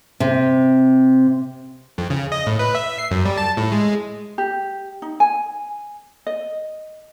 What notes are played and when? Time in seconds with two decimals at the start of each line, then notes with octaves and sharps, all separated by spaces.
0.20 C3
1.98 F2
2.10 C#3
2.32 D#5
2.47 A2
2.59 B4
2.75 E5
2.98 C7
3.11 F#2
3.25 G3
3.37 A5
3.57 A2
3.72 G#3
4.38 G4
5.02 D#4
5.20 G#5
6.27 D#5